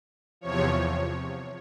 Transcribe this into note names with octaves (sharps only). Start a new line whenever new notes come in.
E2 C3 F3 C#5